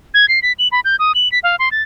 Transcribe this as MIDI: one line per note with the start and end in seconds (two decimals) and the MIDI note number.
0.14 0.28 92
0.29 0.39 96
0.43 0.52 95
0.59 0.68 102
0.72 0.80 83
0.85 0.96 91
0.99 1.12 87
1.15 1.31 102
1.32 1.39 95
1.43 1.56 77
1.59 1.69 84
1.72 1.82 93